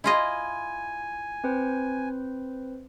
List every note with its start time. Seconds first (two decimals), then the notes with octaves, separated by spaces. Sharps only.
0.04 E4 F4 D#5 G#5
1.44 C4 B4 C5